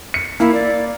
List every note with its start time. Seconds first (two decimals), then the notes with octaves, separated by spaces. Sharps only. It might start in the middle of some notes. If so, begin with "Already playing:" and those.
0.14 C#7
0.40 A#3 E4
0.54 D5